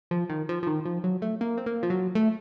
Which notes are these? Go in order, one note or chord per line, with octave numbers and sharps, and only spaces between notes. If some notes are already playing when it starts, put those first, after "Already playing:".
F3
D#3
F3
F3
D#3
F3
F#3
A3
A#3
C4
A#3
F3
F#3
A3